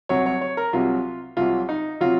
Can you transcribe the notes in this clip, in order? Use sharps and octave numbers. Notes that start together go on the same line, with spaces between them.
C2 C3 F#3 C#5
C#5
C#5
A#4
C2 C3 F#3 F4
C2 C3 F#3 F4
D#4
C3 F#3 F4